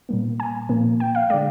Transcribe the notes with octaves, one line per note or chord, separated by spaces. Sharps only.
A#2 G3 A#3
G#5
A#2 F3 A#3
G5
F5
D3 G#3 D5